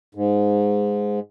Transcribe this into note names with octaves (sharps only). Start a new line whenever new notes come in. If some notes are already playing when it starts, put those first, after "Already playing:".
G#2